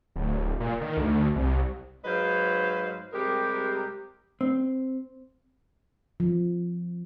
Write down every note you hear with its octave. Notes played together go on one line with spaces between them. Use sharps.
D1
A#2
D#3
D2
C2
G#2 F#3 B4 C5 D#5 F5
C3 G3 G#3 G4 A#4
C4
F3